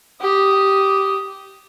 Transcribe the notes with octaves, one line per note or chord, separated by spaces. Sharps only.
G4 D#6